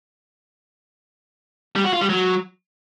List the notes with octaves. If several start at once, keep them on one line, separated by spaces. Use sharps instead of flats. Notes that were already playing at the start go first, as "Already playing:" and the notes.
G3
F#4
F4
G3
F#3